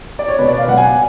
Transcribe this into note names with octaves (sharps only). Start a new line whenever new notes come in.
D5
C#5
B2 B4
D5
F5
F#3 B3 F#5
G#5